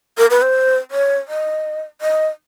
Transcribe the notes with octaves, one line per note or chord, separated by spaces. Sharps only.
A#4
B4
C5
C#5
D#5
D#5